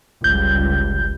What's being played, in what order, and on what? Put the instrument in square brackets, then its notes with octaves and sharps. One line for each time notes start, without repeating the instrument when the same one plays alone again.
[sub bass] G1 [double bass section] C#2 G3 [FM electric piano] G6